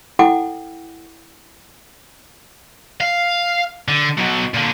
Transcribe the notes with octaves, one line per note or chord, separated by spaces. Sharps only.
E4 A4 F#5 G5 D6
F5
D3
B2 F#3
A#2 D3